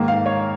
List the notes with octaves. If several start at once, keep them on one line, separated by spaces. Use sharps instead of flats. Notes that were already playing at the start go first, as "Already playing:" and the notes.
Already playing: G#2 D#3 A#3
F5
C#5